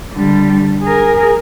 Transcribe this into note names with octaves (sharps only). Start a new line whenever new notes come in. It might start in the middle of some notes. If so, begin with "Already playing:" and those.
D3 G3
G#4 A#4